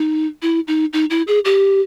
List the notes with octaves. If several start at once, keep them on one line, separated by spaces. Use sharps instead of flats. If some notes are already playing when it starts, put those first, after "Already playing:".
Already playing: D#4
E4
D#4
D#4
E4
G#4
G4